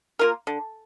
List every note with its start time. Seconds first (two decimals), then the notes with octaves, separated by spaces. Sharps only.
0.19 A#3 F4 A#4
0.47 D3